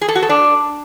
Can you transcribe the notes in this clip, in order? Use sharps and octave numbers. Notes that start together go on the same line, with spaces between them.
G#4
A4
F#4
A4
D4